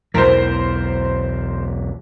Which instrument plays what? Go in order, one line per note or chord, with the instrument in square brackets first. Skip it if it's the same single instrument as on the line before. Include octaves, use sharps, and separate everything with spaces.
[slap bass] B1 E2 E3 [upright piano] A#4 C5